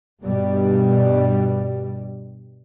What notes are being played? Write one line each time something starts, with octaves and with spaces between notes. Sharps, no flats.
G2 B2 G3